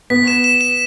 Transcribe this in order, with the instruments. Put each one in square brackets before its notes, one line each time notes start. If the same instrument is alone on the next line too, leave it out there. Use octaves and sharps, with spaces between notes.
[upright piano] B3 [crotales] B6
[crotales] E7
E7
E7